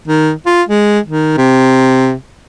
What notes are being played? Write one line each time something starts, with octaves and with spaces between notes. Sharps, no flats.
D#3
F4
G#3
D#3
C3